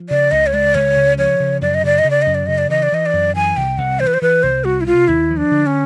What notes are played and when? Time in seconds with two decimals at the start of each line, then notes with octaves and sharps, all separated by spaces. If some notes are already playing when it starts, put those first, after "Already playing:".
Already playing: F3
0.10 C#3 D5
0.31 C#2 D#5
0.47 C#5
0.53 G#3 D5
0.75 C#2 C#5
0.97 C#3
1.18 F3 C#5
1.40 C#3
1.61 F#2 D5
1.74 D#5
1.84 C#3 D5
1.99 D#5
2.04 C#3
2.10 D5
2.22 F#2 D#5
2.35 D5
2.47 C#3 D#5
2.58 D5
2.70 E3 D#5
2.83 D5
2.92 E3 D#5
3.06 D5
3.13 F#2
3.35 E3 G#5
3.57 C2 G5
3.78 C2 F#5
4.00 E3 C5
4.07 B4
4.14 C5
4.22 E3 B4
4.43 C2 C5
4.64 C2 F#4
4.81 E4
4.87 C3 F4
5.08 D#2 E4
5.30 F3
5.37 D4
5.51 D3
5.66 C#4